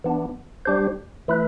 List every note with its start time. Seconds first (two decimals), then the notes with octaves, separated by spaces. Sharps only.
0.04 E3 B3 D4
0.65 G3 D4 G4 C5
1.28 E3 A3 E4 B4